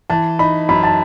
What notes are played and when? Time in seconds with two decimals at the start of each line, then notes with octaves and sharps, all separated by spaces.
0.10 E3 A5
0.39 D#4 B5
0.69 F#2 B5
0.83 A5